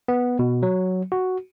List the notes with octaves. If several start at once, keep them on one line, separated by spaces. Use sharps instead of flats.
B3
B2
F#3
F#4